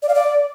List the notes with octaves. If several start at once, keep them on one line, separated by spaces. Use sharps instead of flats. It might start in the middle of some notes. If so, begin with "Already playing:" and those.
D5
F5
D5